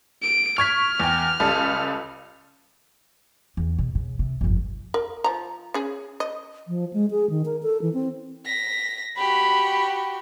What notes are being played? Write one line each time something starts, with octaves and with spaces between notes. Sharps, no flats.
D7
C#6 F6 G#6 B6
E2 G5
C#2 G3 A4
E2
B2
C#3
C3
G1 F2
A#4
F3 A#5
C#4 G#4
D#5
F3
G#3
G#4
D#3
A#4
A4
E3
C4
A#6 B6
F#4 G4 B5